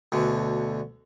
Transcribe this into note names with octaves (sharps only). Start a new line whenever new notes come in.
D2 B2 D3